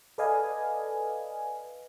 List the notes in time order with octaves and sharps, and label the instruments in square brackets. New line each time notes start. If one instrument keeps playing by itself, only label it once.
[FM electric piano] A4 B4 D5 D#5 F5 G#5